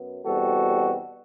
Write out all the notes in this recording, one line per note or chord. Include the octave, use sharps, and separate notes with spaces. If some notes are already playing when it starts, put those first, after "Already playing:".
Already playing: F#2 B3
E2 B2 G3 C4 F#4 A4